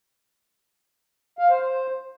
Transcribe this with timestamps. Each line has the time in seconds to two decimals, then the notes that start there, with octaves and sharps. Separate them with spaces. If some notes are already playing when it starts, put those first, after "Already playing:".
1.39 F5
1.50 C5
1.61 C5